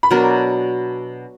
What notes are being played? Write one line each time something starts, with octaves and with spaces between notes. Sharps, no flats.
B5
B2 F#3 D4 A#4 A#5